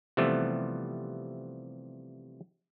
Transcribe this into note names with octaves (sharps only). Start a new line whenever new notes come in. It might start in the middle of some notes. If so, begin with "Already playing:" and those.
C3 E3 F3 G3 A3 B3